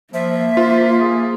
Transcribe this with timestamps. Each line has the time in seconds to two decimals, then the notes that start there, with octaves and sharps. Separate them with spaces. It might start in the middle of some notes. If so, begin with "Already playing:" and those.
0.14 F3 A#3 E5
0.57 F4 C5
1.01 G#4